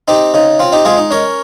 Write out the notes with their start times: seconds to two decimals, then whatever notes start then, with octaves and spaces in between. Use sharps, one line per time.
0.08 C4 D#4 G4
0.34 C#3 D#4
0.59 C4 F4
0.72 D#4 G4
0.85 G#3 F4 G#4
0.98 D#4
1.11 C#4 A#4 C#5